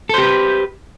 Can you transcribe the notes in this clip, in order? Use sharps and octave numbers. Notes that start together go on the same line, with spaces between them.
G4 A4 B4 C5